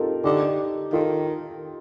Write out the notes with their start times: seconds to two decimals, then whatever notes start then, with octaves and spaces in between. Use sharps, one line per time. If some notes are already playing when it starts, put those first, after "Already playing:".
Already playing: C4 D#4 F4 G4 A4 A#4
0.24 D3 D#4 G4
0.93 D#3 F4 A4